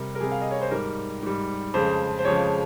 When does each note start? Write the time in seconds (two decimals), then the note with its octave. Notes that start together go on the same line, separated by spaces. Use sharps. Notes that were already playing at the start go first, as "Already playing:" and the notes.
Already playing: C3 G3 A#4
0.15 A#4
0.20 C3 G3 G#4
0.31 F5
0.41 D#5
0.51 C#5
0.61 C5
0.71 G#2 G3 A#4
1.22 G#2 G3
1.74 F2 C#3 F3 G#3 C5
2.19 C5
2.25 F2 C#3 F3 G#3 C#5